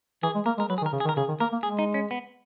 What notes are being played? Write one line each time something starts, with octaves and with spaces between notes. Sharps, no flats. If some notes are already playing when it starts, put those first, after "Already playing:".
E3 G#4
G#3
A#3 A#4
G#3 A#4
F#3 B4
G#4
D#3
A#4
C#3
G#4
D#3
A#4
C#3 G#4
D#3
A#3 A#4
A#3
G#3 G#4
D#4
C#4
B3